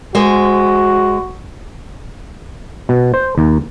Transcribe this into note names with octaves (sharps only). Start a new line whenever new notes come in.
G#3 F#4 C5
B2
C5
D#2